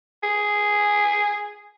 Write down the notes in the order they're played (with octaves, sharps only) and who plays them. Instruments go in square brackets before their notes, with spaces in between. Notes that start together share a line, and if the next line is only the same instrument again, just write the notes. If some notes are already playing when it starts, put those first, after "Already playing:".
[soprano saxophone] G#4